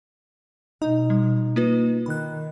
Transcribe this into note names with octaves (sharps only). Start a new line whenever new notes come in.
B2 D#4
G3
A#3 F4 B4
D#3 B5 F#6